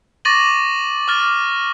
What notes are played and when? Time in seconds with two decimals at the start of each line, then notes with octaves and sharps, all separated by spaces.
0.25 C#6 D6 A6 A#6 D#7 F#7
1.08 D6 F6 A6